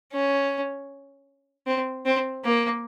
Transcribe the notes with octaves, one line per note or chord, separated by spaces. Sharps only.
C#4
C4
C4
A#3